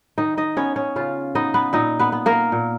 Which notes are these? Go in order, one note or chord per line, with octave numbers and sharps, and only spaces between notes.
D#3 D#4 D#5
D#4 D#5
B3 C#4 C#5
C#4 C#5
C#3 F4 F5
B3 D#4 D#5
B3 B4
A#2 D#4 D#5
B3 B4
B3
A#3 A#4
A#2